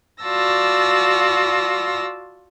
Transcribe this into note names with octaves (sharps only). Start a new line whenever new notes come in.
F4 F#4 D5 A5 E6 A#6